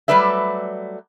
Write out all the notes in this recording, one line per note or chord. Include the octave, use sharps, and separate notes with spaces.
F#3 G3 A3 B4 D5 E5